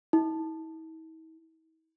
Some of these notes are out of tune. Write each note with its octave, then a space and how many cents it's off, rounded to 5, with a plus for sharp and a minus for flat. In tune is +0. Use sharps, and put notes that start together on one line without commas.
E4 -45